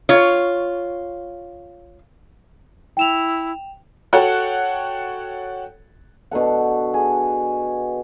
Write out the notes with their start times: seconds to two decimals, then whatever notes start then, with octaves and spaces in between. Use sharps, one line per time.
0.09 F4 C#5
2.97 E4 G5 E7 F7
4.13 F#4 A4 C#5 F#5 G5
6.31 B2 D4 A4 F#5
6.94 G#4